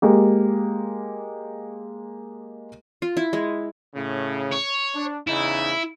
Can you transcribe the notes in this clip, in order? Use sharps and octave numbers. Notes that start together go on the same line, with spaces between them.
G#3 A#3 G4
F4
E4
G#3
A2 C#3
C#5
D4
E2 C#3 D#4 E4